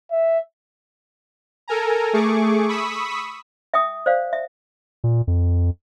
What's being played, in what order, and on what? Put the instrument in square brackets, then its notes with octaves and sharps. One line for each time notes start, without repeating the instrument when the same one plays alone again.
[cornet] E5
[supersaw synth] A4 A#4 G#5 A#5
A3 G#4 C#6 D6
B5 C#6 D#6 E6 B6
[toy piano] E5 G5 D#6
C5 D5 F5
E5
[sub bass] A#2
F2